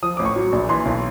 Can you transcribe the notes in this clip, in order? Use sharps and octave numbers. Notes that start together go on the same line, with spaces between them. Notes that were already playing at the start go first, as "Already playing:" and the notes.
F3 D#6
A1 D6
C#6
F#3
A#1
E3 C6
B1